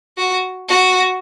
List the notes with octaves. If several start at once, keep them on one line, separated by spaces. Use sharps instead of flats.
F#4
F#4